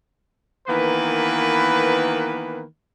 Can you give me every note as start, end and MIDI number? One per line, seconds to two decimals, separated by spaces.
0.68 2.62 51
0.68 2.62 52
0.68 2.62 58
0.68 2.62 59
0.68 2.62 71